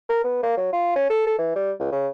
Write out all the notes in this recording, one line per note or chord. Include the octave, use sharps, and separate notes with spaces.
A#4
B3
A#3
F#3
F4
C#4
A4
A4
E3
G3
C#2
C#3